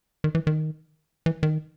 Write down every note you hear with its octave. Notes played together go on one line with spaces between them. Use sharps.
D#3
E3
D#3
E3
D#3